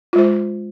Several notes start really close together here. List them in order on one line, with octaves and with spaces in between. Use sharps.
F4 G#3 C5